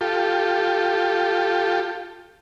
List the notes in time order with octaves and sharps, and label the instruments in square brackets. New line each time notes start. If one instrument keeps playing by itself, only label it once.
[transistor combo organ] F4 G4 A4